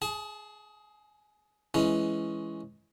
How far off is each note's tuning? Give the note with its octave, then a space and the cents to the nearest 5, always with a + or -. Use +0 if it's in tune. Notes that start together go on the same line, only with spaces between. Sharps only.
G#4 +15 A5 -25
E3 +15 G#3 +15 C#4 +0